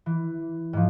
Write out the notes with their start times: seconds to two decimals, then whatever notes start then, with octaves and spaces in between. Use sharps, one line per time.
0.06 E3
0.73 G#2 F3